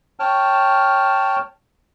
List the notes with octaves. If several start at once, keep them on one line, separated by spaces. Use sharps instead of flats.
C#5 G5 A5 F6